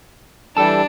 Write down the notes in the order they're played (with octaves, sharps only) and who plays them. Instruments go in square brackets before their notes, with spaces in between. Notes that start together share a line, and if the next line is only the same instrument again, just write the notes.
[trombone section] E3 G3 [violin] D4 [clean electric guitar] A4 A5